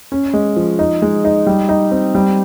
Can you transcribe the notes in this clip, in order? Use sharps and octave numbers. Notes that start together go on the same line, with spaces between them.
C#4
G#3
F3
D#4
G#3
D#4
G3
D#4
C4
G3